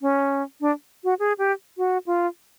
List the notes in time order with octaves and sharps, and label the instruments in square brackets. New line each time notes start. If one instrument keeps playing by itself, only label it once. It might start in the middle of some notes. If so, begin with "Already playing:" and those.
[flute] C#4
D4
F#4
G#4
G4
F#4
F4